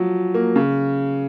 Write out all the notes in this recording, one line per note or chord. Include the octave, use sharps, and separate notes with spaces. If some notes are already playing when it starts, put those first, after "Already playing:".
Already playing: F3 F#3
A#3
C#3